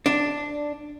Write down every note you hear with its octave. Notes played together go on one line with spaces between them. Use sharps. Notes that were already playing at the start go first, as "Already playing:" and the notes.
D4